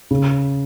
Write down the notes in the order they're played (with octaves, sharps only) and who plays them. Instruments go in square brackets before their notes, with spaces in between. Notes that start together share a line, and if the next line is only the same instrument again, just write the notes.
[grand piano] C#3